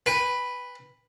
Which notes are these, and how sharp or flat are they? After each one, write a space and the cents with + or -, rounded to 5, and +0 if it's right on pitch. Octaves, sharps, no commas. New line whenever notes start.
B4 +0 G5 +45